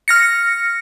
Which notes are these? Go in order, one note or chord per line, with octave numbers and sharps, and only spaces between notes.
F6 A#6 C#7